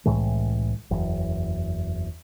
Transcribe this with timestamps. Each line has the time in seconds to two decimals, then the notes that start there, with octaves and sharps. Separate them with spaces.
0.05 C2 A2 E3 G#3
0.91 F#1 E2